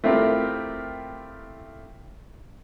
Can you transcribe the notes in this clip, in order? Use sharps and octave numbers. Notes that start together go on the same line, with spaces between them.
A3 C4 E4 F4 G4 A#4